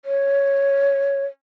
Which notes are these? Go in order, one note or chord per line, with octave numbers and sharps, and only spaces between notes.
C#5